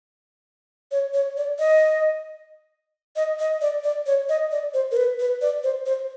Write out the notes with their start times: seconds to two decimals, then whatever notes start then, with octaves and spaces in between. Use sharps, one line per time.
0.91 C#5
1.14 C#5
1.37 D5
1.59 D#5
3.16 D#5
3.39 D#5
3.61 D5
3.84 D5
4.06 C#5
4.29 D#5
4.51 D5
4.74 C5
4.91 A#4
4.97 B4
5.19 B4
5.41 D5
5.63 C5
5.86 C5